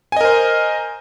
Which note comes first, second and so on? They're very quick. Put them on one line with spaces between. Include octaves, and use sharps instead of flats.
G#5 D#5 A#4 C5